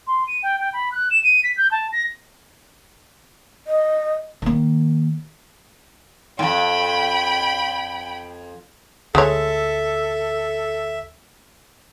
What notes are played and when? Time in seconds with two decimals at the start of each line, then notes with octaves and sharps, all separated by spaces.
0.07 C6
0.28 D#7
0.43 G5
0.59 G5
0.73 B5
0.92 F#6
1.11 E7
1.24 D#7
1.44 B6
1.57 G6
1.71 A5
1.92 A#6
3.67 D#5
4.42 D#3 A#3
6.39 F2 A2 G5 B5
9.15 D2 G#3 A4 C#5 E5